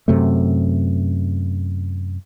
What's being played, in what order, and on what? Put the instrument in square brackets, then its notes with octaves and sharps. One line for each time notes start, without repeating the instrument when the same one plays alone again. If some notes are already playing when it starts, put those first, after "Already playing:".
[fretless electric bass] F#2 C3 A3